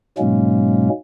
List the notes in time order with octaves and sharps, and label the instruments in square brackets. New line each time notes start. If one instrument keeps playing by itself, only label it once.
[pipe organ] G#2 B2 F#3 G#3 A#3 C#4